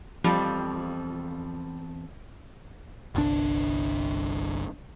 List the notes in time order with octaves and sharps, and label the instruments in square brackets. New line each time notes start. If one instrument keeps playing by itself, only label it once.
[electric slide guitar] E2 C4 A4 [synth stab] F3 [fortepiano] G3
[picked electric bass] G1 C2 D4